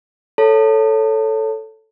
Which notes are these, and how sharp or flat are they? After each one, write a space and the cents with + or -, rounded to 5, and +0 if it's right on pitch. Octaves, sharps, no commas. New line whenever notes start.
A4 +0 C#5 +0 A5 +30